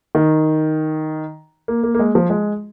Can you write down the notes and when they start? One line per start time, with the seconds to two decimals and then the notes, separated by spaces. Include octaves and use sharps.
0.15 D#3
1.68 A#3
1.84 A#3
1.95 A#3
1.99 G#3
2.15 F3
2.30 G#3